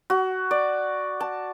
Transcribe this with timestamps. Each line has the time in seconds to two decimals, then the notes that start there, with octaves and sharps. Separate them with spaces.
0.10 F#4
0.51 D5
1.21 A5